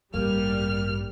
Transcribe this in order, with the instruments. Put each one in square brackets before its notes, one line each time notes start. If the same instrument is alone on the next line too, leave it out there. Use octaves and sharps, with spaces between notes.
[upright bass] A1 G2 [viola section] G3 [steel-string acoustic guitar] A#3 [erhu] F6